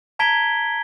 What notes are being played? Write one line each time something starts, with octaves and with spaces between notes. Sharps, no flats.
A5 A#5 G#6 B6 D7 G7